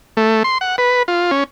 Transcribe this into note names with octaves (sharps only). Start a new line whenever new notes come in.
A3
C6
F#5
B4
F4
C#4